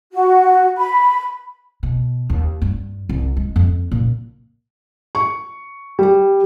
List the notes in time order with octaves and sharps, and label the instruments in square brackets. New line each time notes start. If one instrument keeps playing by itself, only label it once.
[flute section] F#4
B5
[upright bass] B2
D#2
G2
C2
G#3
F2
A#2
[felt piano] C#6
G3